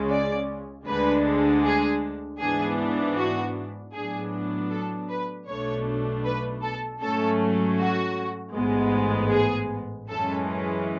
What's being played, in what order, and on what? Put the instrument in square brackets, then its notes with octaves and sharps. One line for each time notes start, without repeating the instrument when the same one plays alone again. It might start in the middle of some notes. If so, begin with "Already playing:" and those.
Already playing: [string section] C#2 C#3 G#3 C#4
D5
D2 D3 G#3 D4 B4
G#4
G#2 E3 B3 D4 G#4
F#4
A2 F#3 B3 D4 G#4
A4
B4
B1 B2 A3 D4 C#5
B4
A4
G#2 F#3 A3 C#4 A4
F#4
A1 G#2 G#3 B3
G#4
F#2 E3 G#3 C#4 A4